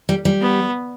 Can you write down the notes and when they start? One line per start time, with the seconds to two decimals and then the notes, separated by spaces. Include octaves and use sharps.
0.09 G3
0.25 G3
0.41 B3